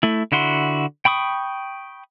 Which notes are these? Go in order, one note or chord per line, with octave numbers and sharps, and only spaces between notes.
A3 E4
D3 E4 F#4 C6
G5 B5 C#6 D#6